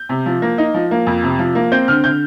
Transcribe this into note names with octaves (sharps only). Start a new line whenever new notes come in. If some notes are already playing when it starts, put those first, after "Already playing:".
Already playing: G6
C3
F3
A#3
D#4
F3
A#3
F2
C3
F3
A#3
C4 G6
D3 F6
D3 G6